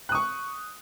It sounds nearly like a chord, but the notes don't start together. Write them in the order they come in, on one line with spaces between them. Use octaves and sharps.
F#6 D#6 C#6